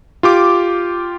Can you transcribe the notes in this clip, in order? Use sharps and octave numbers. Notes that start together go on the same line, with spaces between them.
F4 G4 D6